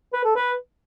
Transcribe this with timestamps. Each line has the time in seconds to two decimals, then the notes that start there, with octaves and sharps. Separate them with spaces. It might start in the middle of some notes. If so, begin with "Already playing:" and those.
0.13 B4
0.24 A4
0.36 B4